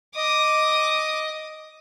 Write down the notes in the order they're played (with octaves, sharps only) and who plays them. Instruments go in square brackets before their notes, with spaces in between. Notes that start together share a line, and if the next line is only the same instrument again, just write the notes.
[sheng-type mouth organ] D#5 [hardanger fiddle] D6 D#6